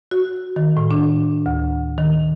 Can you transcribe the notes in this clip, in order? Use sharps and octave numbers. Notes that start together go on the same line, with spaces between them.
F#4
D#3
A2
D4
D2
D#3